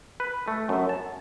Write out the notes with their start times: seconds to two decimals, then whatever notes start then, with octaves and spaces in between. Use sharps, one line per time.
0.20 B4
0.48 A3
0.69 F#2
0.89 A5